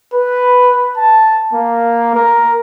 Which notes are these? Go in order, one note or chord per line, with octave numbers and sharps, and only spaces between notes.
B4
A5
A#3
A#4